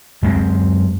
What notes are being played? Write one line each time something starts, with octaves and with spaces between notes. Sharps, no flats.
F#2 G#3 A#3 C4